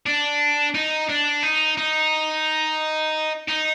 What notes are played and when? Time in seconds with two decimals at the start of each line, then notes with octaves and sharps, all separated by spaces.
0.06 D4
0.75 D#4
1.09 D4
1.43 D#4
1.78 D#4
3.48 D#4